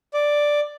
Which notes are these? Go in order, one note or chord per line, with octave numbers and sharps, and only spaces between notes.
D5